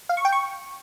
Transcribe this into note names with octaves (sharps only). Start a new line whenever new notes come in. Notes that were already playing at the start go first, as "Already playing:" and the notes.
F5
C#6
G5
C#6